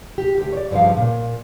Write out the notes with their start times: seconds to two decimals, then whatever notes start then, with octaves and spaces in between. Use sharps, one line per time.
0.18 G4
0.38 D2 G4
0.53 C#5 D5
0.71 G2 C#3 F3 G4 F5
0.97 A#2